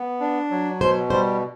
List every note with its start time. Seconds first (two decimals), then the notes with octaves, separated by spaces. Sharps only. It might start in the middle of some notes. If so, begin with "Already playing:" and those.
Already playing: B3
0.20 D4
0.50 F#3
0.81 B2 C5
1.10 G3 C5